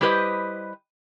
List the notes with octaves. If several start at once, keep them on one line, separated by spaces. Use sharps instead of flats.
G3 E4 G4 B4 C5 D#5